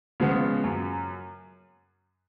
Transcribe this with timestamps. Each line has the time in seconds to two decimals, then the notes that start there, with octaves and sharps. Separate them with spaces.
0.20 C#3 F3 G#3 B3
0.64 F#2